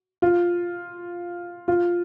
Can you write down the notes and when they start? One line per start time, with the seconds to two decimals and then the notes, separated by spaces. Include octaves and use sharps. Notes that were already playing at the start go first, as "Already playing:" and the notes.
0.22 F4
1.68 F4